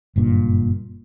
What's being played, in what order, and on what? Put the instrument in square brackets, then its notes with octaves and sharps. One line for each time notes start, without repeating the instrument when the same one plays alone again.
[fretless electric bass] F#1 G2 A#2